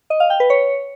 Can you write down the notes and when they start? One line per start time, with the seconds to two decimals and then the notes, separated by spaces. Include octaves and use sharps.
0.10 D#5
0.20 F5
0.30 G5
0.40 B4
0.50 C#5